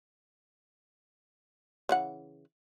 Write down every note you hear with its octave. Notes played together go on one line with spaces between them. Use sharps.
C#3 E3 F#5